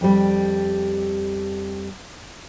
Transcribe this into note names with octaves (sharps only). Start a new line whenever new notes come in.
F2 G3